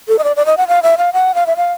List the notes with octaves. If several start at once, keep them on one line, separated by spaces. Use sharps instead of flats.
A4
D#5
D5
D5
D#5
F#5
F5
E5
F5
F#5
F5
E5
F5